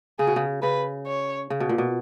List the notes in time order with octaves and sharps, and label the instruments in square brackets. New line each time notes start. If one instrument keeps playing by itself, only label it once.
[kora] C#3 [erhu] G#4
[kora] B2
C#3
[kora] C#3 [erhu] B4
[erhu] C#5
[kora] C#3
B2
A#2
B2